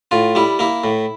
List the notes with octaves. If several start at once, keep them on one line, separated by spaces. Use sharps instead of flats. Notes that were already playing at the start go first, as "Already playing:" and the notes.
A2 F4
G3 E4
A#3 E4
A2